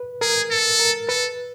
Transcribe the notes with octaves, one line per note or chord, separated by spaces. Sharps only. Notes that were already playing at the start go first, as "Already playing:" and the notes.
Already playing: B4
G#4 A#4
A4
A#4
A4 B4